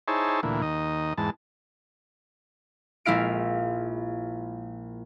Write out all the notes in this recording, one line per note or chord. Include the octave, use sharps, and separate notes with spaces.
D#4 E4 G#4 C5 C#5 A5
D2 A#2 E3
D#2 D#5
E2 G#2 A5
A#1 G#3 E4 F5 D7